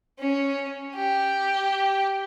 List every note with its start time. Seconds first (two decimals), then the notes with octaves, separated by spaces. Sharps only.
0.19 C#4
0.95 G4